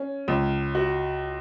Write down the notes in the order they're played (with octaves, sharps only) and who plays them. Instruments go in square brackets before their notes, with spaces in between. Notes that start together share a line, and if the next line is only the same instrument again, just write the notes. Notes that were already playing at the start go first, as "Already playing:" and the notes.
Already playing: [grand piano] C#4
C#2
F#4